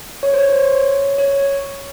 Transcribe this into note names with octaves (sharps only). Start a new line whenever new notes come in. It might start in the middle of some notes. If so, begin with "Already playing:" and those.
C#5
C5
C#5
C#5